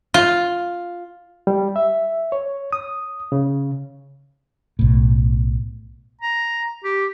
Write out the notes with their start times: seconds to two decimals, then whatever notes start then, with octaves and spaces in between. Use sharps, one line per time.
0.14 F4
1.47 G3
1.76 E5
2.32 C#5
2.73 D#6
3.32 C#3
4.79 B1 A2
6.21 A#5
6.84 G4